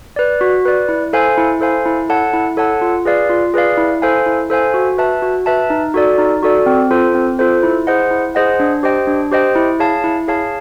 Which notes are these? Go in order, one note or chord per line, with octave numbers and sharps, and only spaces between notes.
B4 D5
F#4
B4 D5
E4
A4 C5 F5 G#5
E4
A4 C5 F5 G#5
E4
A4 C#5 F#5 A5
E4
A4 C#5 F#5 A5
F4
G#4 B4 D5 F5
F4
G#4 B4 D5 F5
E4
A4 C5 F5 G#5
E4
A4 C5 F5 G#5
F#4
B4 E5 A5
F#4
B4 E5 A5
D#4
F#4 A4 D5
D#4
F#4 A4 D5
C4
F4 A4 C5
C4
F4 A4 C5
E4
G#4 C5 D#5 F#5
E4
G#4 C5 D#5 F#5
D4
G4 C5 D#5 G5
D4
G4 C5 D#5 G5
E4
G#4 C#5 F5 A5
E4
G#4 C#5 F5 A5